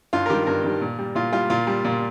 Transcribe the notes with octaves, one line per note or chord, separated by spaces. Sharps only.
G2 F4
A#4
D#3 G3 G4
G2 A#4
D#3 G3
A#2
G3
A#2 F4
G3 F4
A#2 F4
G3
A#2